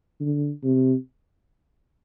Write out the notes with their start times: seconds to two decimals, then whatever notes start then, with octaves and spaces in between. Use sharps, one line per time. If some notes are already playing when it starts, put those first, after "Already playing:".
0.21 D3
0.63 C3